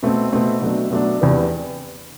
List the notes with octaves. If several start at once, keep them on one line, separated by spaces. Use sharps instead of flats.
B2 A3 C4
B2 A3 C4
B2 F#3 A3 D4
B2 F#3 A3 D4
E2 C3 E3 B3 D4